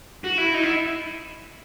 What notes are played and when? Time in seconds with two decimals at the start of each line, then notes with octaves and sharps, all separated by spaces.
0.24 F#4
0.38 E4
0.54 D#4
0.63 E4